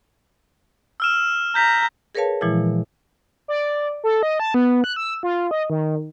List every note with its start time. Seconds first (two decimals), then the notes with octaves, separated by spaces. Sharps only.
1.00 E6 F6 E7
1.55 A#5 G6 B6
2.15 G#4 A#4 B4 C#5 F5 A5
2.41 A#2 E3 F3 G#3 E4
3.48 D5
4.04 A4
4.23 D#5
4.40 A5
4.54 B3
4.84 F#6
4.96 E6
5.23 F4
5.51 D#5
5.70 D#3